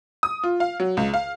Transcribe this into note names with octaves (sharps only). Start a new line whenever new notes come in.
D#6
F4
F5
F#3
C#2
F5